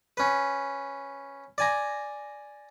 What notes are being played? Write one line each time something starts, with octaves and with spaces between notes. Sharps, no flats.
C#4 B4
D5 G#5 A#5